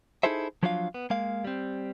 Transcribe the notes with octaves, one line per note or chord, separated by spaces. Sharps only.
D#4 E4 G#4 A4 C5 E5
F3 F#3 D4 F4 D5 F5
B3
G#3 A#3 F5
G3 C4